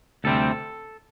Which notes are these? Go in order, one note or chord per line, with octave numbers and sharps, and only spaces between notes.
D2 C3 G3 C4 A4